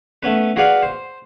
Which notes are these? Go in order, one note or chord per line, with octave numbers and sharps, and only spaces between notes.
A3 B3 C#4 B4
F#4 G#4 B4 D5 F5 F#5
C5